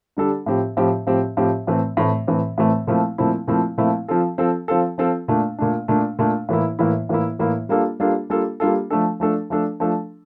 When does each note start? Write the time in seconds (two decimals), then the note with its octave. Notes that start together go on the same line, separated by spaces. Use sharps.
0.17 D3 G3 D4 A4
0.46 A2 F3 C4 G4
0.77 A2 F3 C4 G4
1.07 A2 F3 C4 G4
1.37 A2 F3 C4 G4
1.67 A2 E3 A3 C4
1.97 A2 E3 A3 C4
2.27 A2 E3 A3 C4
2.58 A2 E3 A3 C4
2.87 A#2 F3 A3 C4 E4
3.18 A#2 F3 A3 C4 E4
3.48 A#2 F3 A3 C4 E4
3.78 A#2 F3 A3 C4 E4
4.08 F3 C4 F4 A4
4.38 F3 C4 F4 A4
4.68 F3 C4 F4 A4
4.98 F3 C4 F4 A4
5.28 A#2 A3 D4
5.59 A#2 A3 D4
5.88 A#2 A3 D4
6.19 A#2 A3 D4
6.49 A2 E3 A#3 E4
6.79 A2 E3 A#3 E4
7.09 A2 E3 A#3 E4
7.39 A2 E3 A#3 E4
7.69 G3 A#3 D4 F4 A4
8.00 G3 A#3 D4 F4 A4
8.30 G3 A#3 D4 F4 A4
8.60 G3 A#3 D4 F4 A4
8.90 F3 A3 D4 A4
9.20 F3 A3 D4 A4
9.50 F3 A3 D4 A4
9.80 F3 A3 D4 A4